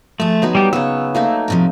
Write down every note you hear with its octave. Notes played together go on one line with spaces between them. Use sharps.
F3 A3 G#4
F#3 B3 D#4
G3 G4
C#3 B3 C#5 E6
A3 A#3 D#4
A2 C3 F3